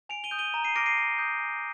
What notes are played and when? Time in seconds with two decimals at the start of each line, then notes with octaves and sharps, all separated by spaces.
0.09 G#5 D7 F7
0.24 D#7 G7
0.31 D#6 G6
0.39 D#7 G7
0.54 A#5
0.64 C7 D#7
0.76 D6 F6 A#6 D7
0.86 C7 D#7
0.97 A#5
1.18 D#6 G6
1.40 G#5